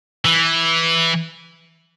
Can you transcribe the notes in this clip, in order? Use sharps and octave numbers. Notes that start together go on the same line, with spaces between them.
E3